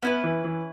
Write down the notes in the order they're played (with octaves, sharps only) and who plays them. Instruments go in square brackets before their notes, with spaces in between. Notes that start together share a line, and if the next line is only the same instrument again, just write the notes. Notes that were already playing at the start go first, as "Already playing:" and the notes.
[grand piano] B3 [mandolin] C#4 E4 B4
[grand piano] E3
E3